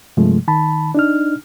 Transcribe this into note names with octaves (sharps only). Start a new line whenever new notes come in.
G2 C3 F3 G#3 A3
D#3 A5 B5
D4 D#4 F6